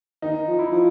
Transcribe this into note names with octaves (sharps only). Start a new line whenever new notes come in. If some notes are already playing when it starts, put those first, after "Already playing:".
D#3 D#4
F3
E4
F3